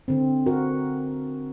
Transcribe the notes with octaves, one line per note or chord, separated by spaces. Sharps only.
D3 C4
F#4 A#4